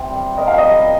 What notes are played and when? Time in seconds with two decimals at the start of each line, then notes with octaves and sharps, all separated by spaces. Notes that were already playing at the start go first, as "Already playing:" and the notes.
Already playing: C3 C4
0.10 G3
0.38 A#4 D#5
0.48 F5
0.58 D#5
0.66 G3